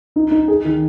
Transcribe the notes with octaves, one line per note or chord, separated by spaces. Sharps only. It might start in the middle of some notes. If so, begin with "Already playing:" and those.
D#4
D#4
G#4
D#3